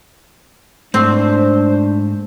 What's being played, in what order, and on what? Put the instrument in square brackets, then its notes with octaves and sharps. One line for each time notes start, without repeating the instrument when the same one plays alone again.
[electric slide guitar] G#2 A3 [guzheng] C4 [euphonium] D4 [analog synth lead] C5